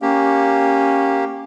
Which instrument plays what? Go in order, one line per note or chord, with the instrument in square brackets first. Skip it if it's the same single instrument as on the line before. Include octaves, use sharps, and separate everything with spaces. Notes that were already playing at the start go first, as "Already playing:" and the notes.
[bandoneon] A#3 G4 [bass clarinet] C#4